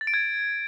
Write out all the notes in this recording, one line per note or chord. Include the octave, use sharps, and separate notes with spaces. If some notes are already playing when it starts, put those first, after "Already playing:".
A6
D7
G#6